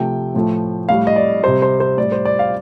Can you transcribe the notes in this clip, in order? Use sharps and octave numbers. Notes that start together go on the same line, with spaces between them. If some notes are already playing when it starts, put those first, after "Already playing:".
Already playing: C3 F3 A3 G5
A2 F3 A3
A2 G3 F5
D#5
D5
C3 G3 C5
C5
C5
A2 G3 D5
C5
D5
F5